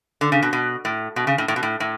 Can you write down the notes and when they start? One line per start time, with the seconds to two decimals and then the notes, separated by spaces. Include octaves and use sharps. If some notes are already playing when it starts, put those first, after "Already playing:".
0.21 D3
0.32 C#3
0.42 B2
0.53 B2
0.85 A2
1.16 B2
1.27 C#3
1.38 A2
1.48 A2
1.56 B2
1.63 A2
1.80 A2